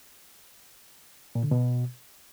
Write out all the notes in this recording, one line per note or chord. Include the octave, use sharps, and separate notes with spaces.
A#2
D3
B2